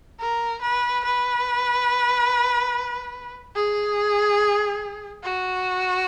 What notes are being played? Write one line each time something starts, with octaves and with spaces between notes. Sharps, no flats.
A#4
B4
B4
G#4
F#4